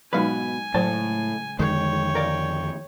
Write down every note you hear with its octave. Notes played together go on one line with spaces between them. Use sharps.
G#2 B2 F#3 G#3 D#4 B4 G#5
C#2 A2 F#3 C5 A5
F2 D3 D#3 G#3 C#5 G5
A#4 D5 F5